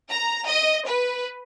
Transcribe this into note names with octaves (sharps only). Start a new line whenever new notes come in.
A#5
D#5
B4